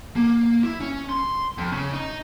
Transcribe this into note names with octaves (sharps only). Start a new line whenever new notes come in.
A#3
E4
C#4
C6
F2
C#3
D#4